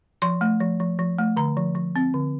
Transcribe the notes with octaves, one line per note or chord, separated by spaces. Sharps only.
F3 C6
A3
F3
F3
F3
A3
D3 A#5
F3
F3
C4
D3